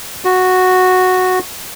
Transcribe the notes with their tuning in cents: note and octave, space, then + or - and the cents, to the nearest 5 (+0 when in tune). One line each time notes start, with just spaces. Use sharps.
F#4 -5